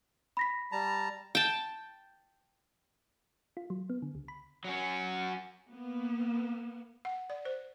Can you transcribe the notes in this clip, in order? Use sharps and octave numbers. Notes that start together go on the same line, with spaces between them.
B5 A#6 B6
G3 A5 A#5
G5 A5
F4
F#3
B3
D3
C#2
B5
F#3 C#4
A#3 B3
F#5
D5
C5